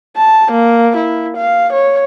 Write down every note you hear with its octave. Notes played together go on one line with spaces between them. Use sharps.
A5
A#3
E4
F5
C#5